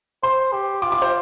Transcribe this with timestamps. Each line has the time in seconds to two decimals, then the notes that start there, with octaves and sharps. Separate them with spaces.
0.23 C5 C6
0.53 G4
0.82 F4 D6
0.92 D6
1.02 C5